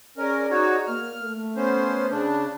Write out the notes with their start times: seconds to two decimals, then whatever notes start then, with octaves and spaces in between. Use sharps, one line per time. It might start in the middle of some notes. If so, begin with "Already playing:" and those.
0.18 C#4 G#4 A#4 D5
0.51 D#4 F#4 C#5
0.87 A#3 F6
1.21 A3
1.56 B3 C#4 C5
2.11 C#3 D4